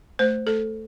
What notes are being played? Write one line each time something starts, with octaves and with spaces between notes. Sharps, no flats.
A3 C5
A3 A4